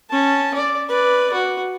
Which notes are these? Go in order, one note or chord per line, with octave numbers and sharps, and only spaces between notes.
C#4 A5
D5
B4 D5
F#4